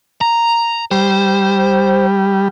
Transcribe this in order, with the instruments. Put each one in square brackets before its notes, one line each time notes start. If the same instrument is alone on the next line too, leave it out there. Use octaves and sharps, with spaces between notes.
[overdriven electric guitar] A#5
[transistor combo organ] G3 [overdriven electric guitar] C5